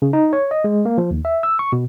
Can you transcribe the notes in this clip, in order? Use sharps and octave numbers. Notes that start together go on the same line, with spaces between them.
C#3
D#4
C#5
D#5
G#3
A#3
F3
D#2
E5
E6
C#6
B2